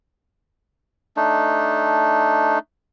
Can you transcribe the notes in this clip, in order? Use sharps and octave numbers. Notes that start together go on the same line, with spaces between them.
A3 D4 D#4